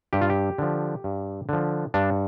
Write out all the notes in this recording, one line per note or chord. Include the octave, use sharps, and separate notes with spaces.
G2 G4
F4
G4
D3 F3
G2
D3 F3
G2 D4